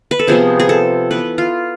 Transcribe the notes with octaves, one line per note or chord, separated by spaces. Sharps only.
B4
A4
C3 F3 B3 G#4
G#4
A4
E3 B3 B4
F4